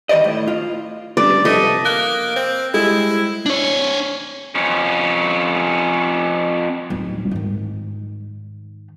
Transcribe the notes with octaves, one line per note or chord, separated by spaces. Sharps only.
D#3 G3 C5 D5 D#5
A2
F4
G2 C#3 B3 D5
C3 F3 A3 D#5
A#3 F#6
C4
G3 G#3 E4 G#4
D4 C#5
F2 C#4
D1 D#4
G#2 D#3